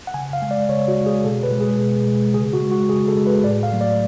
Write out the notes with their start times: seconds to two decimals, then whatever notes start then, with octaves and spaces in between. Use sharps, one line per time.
0.07 F#5
0.14 C#3 G#5
0.33 F5
0.42 G#3
0.51 D5
0.69 C#3 C#5
0.88 F#4
0.97 G#3
1.06 G#4
1.24 B2 A4
1.43 B4
1.52 G#3
1.61 G#4
1.79 B2
2.07 G#3
2.34 C#3 G#4
2.53 F#4
2.62 G#3
2.71 F#4
2.89 C#3 G#4
3.08 A4
3.17 G#3
3.27 B4
3.44 A2 D5
3.63 F5
3.72 F#3 A3
3.81 D5